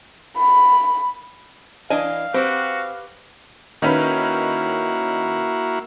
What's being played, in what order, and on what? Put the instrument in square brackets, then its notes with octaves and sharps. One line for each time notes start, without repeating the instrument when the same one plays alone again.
[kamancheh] B5
[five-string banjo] E3 D4 G#5 [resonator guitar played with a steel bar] D#5 [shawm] F5
[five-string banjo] C4 [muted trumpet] F#4 [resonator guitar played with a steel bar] G4 B4
[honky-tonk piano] D#3 C#4 B4 [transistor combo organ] A#3 E4 F#4